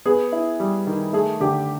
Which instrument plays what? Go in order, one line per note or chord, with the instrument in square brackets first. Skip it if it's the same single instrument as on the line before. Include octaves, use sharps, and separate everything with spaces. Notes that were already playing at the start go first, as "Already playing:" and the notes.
[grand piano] B3 [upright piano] G#4
[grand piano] E4
G3
D#3
[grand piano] A3 [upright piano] G#4
[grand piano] D3 [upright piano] G4